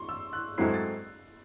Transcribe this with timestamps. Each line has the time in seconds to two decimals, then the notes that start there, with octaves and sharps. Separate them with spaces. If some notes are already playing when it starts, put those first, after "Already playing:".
Already playing: C6 C#6
0.09 E6
0.33 F#6
0.58 G#2 F#3 A3 C4 E4 C7
0.74 A6